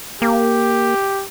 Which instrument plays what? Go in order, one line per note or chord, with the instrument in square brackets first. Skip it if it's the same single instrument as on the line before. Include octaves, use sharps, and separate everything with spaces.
[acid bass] A#3 [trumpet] G4